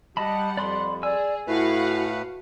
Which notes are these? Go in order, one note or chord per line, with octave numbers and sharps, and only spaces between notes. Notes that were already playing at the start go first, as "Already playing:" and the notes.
G3 D#5 F#5 A5 B5
F2 D5 B5 C6
G#4 D5 G#5 E6
A2 A3 E4 F#4 B4 F5 F#5